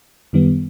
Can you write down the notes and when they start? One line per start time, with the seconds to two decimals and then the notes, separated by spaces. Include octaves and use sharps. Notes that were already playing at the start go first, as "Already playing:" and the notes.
0.33 F#2 D#3 G3 B3